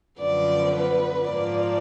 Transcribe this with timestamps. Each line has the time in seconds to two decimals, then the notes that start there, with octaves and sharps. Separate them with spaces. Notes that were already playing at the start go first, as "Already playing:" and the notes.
0.19 F#2 D3 F3 B3 D5
0.74 B4
1.28 G#2 F3 A#3 D5